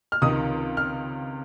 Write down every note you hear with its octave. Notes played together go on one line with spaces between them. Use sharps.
F6
C#2 C3 D#3 D#6
F6